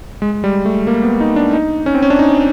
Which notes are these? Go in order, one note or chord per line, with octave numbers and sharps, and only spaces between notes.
G#3
G3
A3
A#3
B3
D#4
D4
D#4
C#4
C4
C#4
D4
D#4